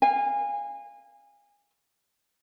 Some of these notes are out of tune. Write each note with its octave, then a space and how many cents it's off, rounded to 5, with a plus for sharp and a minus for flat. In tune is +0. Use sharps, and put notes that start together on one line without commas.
F5 +0 G#5 -25